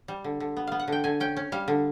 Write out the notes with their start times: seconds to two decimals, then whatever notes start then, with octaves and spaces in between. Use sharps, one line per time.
0.08 G3
0.24 D3
0.40 D3
0.57 B3
0.67 B3 F5
0.79 F#5
0.88 D3 G5
1.04 D3 G#5
1.20 C#4 G5
1.37 C#4
1.52 G3 F5
1.68 D3